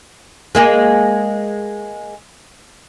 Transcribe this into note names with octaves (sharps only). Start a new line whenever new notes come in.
G#3 A#3 G#4